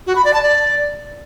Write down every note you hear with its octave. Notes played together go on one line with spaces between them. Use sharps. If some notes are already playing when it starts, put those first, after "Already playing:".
F#4
B5
D5
A5
D5